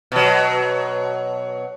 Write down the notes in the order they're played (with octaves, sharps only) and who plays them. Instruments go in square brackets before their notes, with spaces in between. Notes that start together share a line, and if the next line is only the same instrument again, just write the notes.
[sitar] B2 F#3